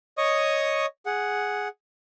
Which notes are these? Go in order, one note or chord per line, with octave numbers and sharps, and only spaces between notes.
C#5 D#5 C#6 D#6
G#4 F#5